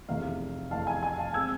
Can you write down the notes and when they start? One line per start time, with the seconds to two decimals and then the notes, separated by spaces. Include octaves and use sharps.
0.08 F1 E2 C3 E3 A3 F5
0.71 F1 E2 C3 E3 A3 F5 A5
0.87 G#5
1.03 G#5
1.18 F5 A5
1.34 G#3 C4 E6 G#6